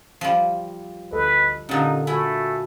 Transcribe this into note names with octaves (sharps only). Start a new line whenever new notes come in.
F3 G3
D2 A4 B4 D#5
A#2 D3 C#4 D#4 G4
A3 E4 F#4 G#5